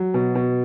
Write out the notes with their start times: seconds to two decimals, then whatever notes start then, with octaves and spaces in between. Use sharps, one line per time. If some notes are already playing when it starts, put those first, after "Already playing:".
Already playing: F#3
0.14 B2
0.35 B2